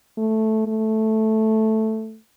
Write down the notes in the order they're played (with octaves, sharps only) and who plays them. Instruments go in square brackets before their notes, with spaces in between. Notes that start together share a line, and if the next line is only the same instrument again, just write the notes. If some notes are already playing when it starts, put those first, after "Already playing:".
[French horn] A3
A3